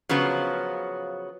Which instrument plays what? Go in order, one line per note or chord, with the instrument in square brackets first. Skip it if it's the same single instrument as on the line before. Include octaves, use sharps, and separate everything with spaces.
[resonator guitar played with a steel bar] C#3 F3 F#3 B3